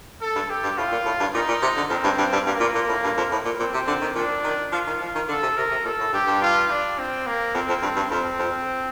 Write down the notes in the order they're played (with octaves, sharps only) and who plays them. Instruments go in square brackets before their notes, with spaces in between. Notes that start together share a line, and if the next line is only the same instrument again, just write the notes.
[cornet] A4
[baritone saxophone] G2
[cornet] G4
[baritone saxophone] G2
[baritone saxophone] A2 [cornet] F4
[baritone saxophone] A#2
A2
G2
[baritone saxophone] A#2 [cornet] D#4
[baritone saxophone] A#2
C3
D3
[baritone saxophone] F2 [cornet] C4
[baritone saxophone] G2
G2
G2
[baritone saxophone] G2 [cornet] A#3
[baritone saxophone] A#2
A#2
A2
G2
F2
A2
A#2
[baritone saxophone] A#2 [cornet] C4
[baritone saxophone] C3
D3
D#3
[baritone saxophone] A#2 [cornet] D4
[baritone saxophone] D#3
[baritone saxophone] F3 [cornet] F4
[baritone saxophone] D#3
F3
D#3
[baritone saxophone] D3 [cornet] A4
[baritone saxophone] C3
[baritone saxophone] C3 [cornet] A#4
[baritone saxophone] C3
[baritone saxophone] A#2 [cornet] A4
[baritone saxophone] A2
[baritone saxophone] G2 [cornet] G4
[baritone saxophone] G2
[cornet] F4
D4
C4
A#3
[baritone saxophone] F2 [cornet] C4
[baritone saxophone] F2
G2
G2
[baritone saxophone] F2 [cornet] C4
[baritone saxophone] F2